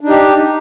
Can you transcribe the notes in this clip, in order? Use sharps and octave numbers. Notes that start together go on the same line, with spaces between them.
D4 D#4 G4